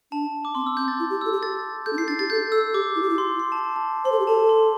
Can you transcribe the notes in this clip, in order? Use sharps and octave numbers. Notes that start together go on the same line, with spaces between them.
D4 A5
D6
C4 C6
E6
C4 G6
A6
E4
G4
A4 E6
G4
A6
A4 G6
D4
E4 C7
D4 A6
G4 A6
A4 G6
A4 E6
G4 D6
E4
G4
E4
C6
C6
A5
A5
C5 C6
A4
G4
A4 A5
C6